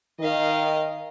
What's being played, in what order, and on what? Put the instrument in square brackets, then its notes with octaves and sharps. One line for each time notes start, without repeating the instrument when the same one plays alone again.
[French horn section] D#3 [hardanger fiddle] D#5 F5